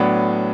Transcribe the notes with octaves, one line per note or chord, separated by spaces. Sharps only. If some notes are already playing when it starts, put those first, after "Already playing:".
Already playing: A2 F#3 B3 D4